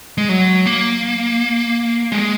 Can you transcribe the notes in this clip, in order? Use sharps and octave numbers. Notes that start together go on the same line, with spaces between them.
G#3
F#3
A#3
G#3